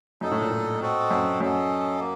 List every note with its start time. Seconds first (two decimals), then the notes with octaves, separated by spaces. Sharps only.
0.21 F#2 D#4 A4 D#5
0.31 A2
0.41 A#2
0.51 A2
0.81 C4 F#4 A4 D#5
1.11 F#2
1.40 F#2 C#4 A4 D#5
2.00 A#3